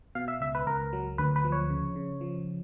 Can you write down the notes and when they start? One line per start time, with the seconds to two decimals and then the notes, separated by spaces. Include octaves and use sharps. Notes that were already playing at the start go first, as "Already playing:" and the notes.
0.15 B2 F5
0.28 E5
0.41 C#2 E5
0.55 B4
0.67 C#2 A#4
0.93 F#3
1.18 D2 B4
1.36 B4
1.44 F3
1.52 C#5
1.70 C#3
1.96 C#3
2.21 F3